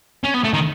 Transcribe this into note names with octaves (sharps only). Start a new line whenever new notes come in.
C#4
B3
A3
D#3